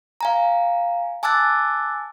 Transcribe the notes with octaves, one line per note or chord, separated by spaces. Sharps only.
F5 G#5 A#5
G#5 A5 D6 E6 F#6 A6